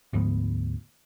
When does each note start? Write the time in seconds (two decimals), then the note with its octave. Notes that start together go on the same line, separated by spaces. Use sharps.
0.13 D2 G#2 F3 B3